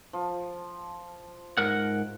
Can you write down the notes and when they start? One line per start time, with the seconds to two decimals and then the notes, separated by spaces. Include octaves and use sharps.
0.13 F3
1.58 G#2 A#4 F#5